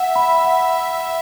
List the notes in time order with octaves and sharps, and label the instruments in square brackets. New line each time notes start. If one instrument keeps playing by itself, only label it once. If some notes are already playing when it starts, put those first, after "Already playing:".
Already playing: [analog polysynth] E5 [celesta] F#5
[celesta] B5
F#5